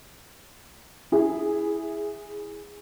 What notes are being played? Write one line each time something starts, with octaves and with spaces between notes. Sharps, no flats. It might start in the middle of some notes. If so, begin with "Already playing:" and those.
E4 G#4